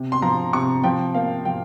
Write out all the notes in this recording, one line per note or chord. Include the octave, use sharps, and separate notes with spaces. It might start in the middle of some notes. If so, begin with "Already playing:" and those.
Already playing: C3
C6
F3 A#5
C3 C#6
F3 G5
A#3 F5
F3 G5